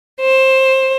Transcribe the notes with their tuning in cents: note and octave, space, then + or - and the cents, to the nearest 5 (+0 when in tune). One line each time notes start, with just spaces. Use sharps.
C5 +15